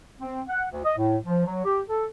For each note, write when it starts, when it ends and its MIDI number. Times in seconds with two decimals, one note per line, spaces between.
0.21 0.41 60
0.49 0.64 78
0.71 0.83 38
0.84 0.93 75
0.97 1.17 45
1.25 1.44 53
1.46 1.62 54
1.65 1.82 67
1.88 2.05 69